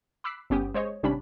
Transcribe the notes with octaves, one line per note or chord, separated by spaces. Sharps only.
B5 D6 E6 F#6 B6 C7
G1 B3 C#4 G4 D#6
G#3 C5 C#5 D#5
G#1 C3 G3 C#4 D4 B5